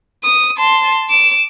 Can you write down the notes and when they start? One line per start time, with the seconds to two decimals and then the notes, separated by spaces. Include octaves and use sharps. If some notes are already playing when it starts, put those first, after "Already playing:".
0.24 D#6
0.58 A5 C6
1.09 D6 E7